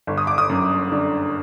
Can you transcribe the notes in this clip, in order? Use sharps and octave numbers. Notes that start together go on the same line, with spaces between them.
G1
D#6
D6
D#6
F#2
D3